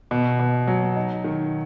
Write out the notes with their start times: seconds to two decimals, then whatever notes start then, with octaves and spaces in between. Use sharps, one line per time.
0.11 B2
0.39 B2
0.67 F#3
0.96 D#4
1.24 D#3